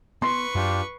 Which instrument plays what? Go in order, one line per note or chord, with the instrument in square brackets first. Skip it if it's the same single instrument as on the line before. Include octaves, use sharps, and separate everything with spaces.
[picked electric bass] B3 [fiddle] B4 C#6 [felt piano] C6 C7
[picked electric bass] F#2 [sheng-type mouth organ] D4 F4 G4